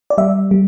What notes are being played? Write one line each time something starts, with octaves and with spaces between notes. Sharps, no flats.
D5
G3 E5
G3